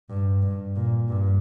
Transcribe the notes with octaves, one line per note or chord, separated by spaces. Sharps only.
G2
G2
A#2
G2